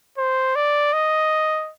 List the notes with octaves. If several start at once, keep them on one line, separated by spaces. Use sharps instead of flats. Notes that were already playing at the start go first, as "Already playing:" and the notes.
C5
D5
D#5